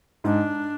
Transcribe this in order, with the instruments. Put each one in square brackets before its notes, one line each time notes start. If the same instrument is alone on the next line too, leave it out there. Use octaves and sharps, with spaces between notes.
[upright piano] G#2 [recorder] D4